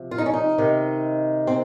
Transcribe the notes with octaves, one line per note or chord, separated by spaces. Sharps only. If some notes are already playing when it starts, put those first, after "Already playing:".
Already playing: C3 F3
F4
D#4
C#4
D#4
C3 D#3
C4